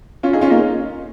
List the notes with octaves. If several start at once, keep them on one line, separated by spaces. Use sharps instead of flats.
C#4 F4
D#4 G#4
C#4 F4
A#3 D#4